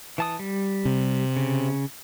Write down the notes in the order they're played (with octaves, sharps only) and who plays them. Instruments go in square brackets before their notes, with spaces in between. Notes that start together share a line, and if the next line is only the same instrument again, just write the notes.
[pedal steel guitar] E3 A5 D#6
G3
[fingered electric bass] C3
[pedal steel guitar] C#3